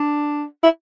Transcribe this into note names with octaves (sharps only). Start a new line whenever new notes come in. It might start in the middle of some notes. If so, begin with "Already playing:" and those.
Already playing: D4
E4